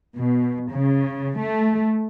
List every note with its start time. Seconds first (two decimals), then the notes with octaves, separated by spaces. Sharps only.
0.17 B2
0.70 C#3
1.37 A3